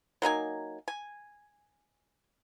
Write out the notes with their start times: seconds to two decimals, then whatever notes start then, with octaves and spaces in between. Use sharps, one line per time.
0.22 F#3 A#3 D#4 G#5
0.88 G#5